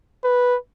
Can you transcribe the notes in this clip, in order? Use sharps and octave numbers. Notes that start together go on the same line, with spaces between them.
B4